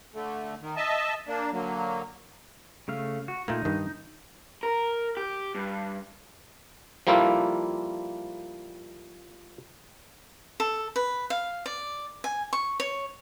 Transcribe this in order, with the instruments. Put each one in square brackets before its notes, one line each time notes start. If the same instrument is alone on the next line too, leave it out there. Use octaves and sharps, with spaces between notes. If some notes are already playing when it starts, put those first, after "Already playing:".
[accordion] D3 A3
D#3
D#5 E5 A5
A#3 D4
D3 F#3 A#3
[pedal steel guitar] C#3 A3 F5
F#4
[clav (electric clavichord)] A#2 A3 A#3 [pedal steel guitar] D#4
[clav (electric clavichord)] G2 D#3
[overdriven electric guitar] A#4
G4
G2
[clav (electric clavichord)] F3 G3 A#3 E4 F4 A4
[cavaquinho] A4
B4
F5
D5
G#5
C#6
C#5